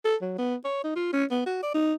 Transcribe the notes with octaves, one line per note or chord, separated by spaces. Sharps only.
A4
F#3
B3
C#5
D#4
F4
C#4
B3
F#4
D5
D#4